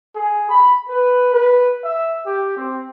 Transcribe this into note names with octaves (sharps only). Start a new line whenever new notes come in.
G#4
B5
B4
B4
E5
G4
C4